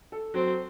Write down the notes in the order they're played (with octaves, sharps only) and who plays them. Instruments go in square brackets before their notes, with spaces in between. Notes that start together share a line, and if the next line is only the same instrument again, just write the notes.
[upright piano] A4
[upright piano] F#3 [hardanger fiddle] C4